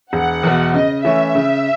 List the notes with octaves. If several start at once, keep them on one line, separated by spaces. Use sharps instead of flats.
E1 F#5
E2 B2
C#3 D#5
E3 A3 C#4 E5
C#3